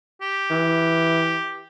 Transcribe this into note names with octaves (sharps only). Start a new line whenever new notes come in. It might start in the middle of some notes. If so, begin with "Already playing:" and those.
G4
E3